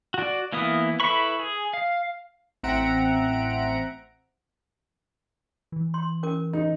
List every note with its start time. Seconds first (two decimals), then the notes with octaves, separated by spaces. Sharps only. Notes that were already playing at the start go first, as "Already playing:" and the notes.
0.14 F#4 D5
0.53 E3 A#3 B3 E4 D#6
1.00 E4 A4 B4 B5 C#6
1.39 G#4
1.73 F5
2.63 A1 C4 E5 F#5 A#5 D7
5.72 E3
5.94 C6
6.23 C#4 A#4 D6
6.53 D#4